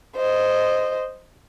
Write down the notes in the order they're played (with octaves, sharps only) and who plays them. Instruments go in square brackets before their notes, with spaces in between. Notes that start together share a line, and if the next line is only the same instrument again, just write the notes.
[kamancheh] C5 D#5